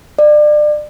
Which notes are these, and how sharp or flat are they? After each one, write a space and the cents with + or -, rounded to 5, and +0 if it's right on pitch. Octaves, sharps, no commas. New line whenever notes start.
D5 +30